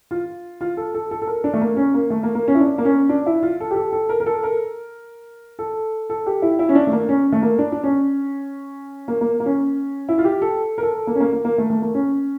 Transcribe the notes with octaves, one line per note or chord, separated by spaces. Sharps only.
F4
F4
A4
A4
A4
A4
A#4
D4
A3
A#3
C#4
A#3
A3
A#3
A#3
C#4
E4
D4
A#3
C#4
D4
E4
F4
A4
G4
A4
A4
A#4
A#4
A4
A#4
A4
A4
G4
E4
E4
C#4
D4
A3
A#3
C#4
A3
A#3
D4
D4
C#4
A#3
A#3
A#3
C#4
E4
F4
G4
A4
A#4
A4
A#3
C#4
A#3
A#3
A#3
A3
A3
A#3
C#4